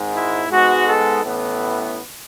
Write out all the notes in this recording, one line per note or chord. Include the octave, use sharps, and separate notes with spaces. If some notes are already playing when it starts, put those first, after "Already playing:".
Already playing: G#1 G#2 G#3
E4
G#2 G#3 B3 F#4
A4
A1 A2 E3 B3